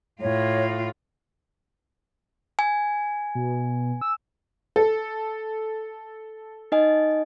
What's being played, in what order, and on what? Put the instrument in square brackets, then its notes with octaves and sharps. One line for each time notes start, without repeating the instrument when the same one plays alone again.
[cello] A2 F4 [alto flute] C#5
[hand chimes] G#5
[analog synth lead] B2
E6
[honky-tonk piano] A4
[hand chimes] D#4 D#5 G#5